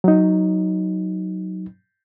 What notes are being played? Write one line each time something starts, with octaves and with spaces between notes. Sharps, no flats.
F#3 D#4